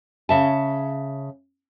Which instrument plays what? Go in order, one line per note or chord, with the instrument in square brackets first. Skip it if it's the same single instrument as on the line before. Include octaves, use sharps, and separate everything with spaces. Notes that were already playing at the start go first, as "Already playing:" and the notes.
[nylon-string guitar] C#3 E5 A5